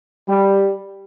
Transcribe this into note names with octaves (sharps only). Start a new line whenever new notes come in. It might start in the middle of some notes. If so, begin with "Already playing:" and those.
G3